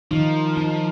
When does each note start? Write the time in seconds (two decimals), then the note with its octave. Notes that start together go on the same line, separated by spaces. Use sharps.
0.11 D#3 F3 D#4
0.57 D#4